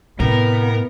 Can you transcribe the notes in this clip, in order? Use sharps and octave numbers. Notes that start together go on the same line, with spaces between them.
A2 C3 B3 A#4